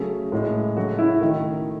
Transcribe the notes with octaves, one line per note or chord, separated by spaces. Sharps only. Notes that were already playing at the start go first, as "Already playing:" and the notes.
Already playing: C#3 F#3 A3 G#4
A2 G#3
C#3 F#3 A3 F#4
E4
D#3 A3